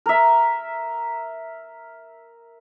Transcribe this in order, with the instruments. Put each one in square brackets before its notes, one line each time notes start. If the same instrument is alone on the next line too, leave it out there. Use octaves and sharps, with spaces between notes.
[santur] A#4 E5